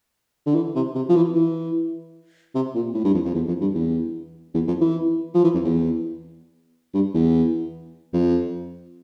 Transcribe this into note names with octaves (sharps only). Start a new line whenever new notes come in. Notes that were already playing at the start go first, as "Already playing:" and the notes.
D3
E3
C3
C3
F3
E3
E3
C3
A#2
A2
G2
F2
F2
E2
F2
G2
E2
E2
F2
E3
F3
E3
F2
E2
G2
E2
F2